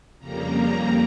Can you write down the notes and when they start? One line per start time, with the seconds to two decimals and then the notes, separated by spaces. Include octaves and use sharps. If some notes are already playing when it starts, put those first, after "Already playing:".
0.19 F2 C#3 G3 A#3 A#5
0.72 A#5